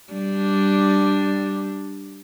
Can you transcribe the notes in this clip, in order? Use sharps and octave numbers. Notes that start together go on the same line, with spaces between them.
G3 D4